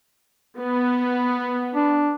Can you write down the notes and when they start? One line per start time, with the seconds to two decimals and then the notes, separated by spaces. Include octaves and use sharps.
0.60 B3
1.75 D4